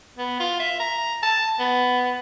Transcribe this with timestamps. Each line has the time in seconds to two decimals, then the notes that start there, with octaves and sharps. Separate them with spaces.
0.18 B3
0.40 F4
0.59 E5
0.80 A#5
1.22 A5
1.59 B3